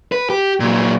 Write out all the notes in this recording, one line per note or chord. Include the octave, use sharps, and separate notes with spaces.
B4
G4
A#2 F#3